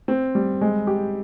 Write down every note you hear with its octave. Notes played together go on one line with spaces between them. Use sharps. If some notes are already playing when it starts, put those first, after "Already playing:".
C4
G3
G#3
G4